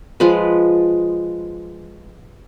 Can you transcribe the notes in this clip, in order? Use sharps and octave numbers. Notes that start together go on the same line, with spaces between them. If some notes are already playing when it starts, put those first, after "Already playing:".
F3 G#3 F4 B4